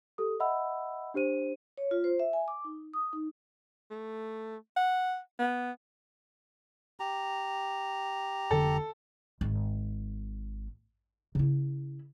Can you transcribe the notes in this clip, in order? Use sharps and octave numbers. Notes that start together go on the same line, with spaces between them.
G4 A4 D#6
D#5 E5 F#5 B5 E6
D4 G4 C5 D#7
C#5
F4
C5
E5
G#5
D6
D#4
D#6
D#4
A3
F#5
B3
G4 A#5
F1 D3 A4
G#1
C#3 E4